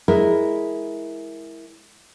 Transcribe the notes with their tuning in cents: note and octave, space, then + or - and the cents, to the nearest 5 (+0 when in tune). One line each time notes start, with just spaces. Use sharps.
G#3 +0 E4 -5 A#4 +0